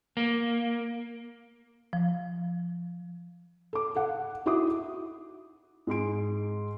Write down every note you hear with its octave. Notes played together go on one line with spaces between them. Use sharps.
A#3
F3
A4 D6
A4 F5 F#5
D#4 E4 F#4 E5 D6 D#6
G#2 G#3 C6 D7